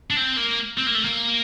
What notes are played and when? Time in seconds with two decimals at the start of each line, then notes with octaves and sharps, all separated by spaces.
0.10 D4
0.17 C4
0.37 A#3
0.78 C4
0.87 A#3
0.95 A3
1.05 A#3